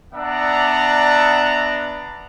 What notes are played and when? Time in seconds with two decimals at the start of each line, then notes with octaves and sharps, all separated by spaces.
0.14 B3 D4 D5 E5 F#5 A#5